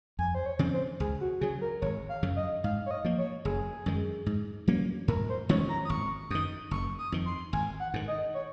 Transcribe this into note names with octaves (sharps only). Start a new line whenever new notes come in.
F2 G#5
C5
C#5
C#3 F3 C4
C5
C#2 G#4
F#4
C#3 F#3 G#4
A#4
G#1 C#5
F5
F#2 C#3 F#3
D#5
G#2 F5
C#5
D#5
F3 A#3
C#5
F#1 G#4
F#2 D#3 G#3
G#2
F#3 A#3 C#4
G#2 A#4
C5
D#3 G#3 C#4 C#5
A#5
D#6
G#1 C#6
F#2 D#3 D#6
F#1 C#6
D#6
F2 D#3
C6
G#1 G#5
F#5
G#2 D#3
D#5
C#5